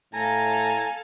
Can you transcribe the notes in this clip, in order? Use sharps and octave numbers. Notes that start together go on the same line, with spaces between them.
A2 A4 F5 G#5 A#5